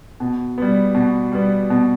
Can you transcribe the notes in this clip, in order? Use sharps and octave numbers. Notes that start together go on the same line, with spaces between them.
B2
G3 B3
B2
G3 B3
B2